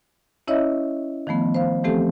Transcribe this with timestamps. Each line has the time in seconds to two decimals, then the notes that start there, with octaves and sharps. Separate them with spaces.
0.48 C#4 E4 C#5 D#5 E5
1.27 D#3 F3 A3 B3
1.54 C5 F5
1.84 E3 F3 A3 C4 G4 A4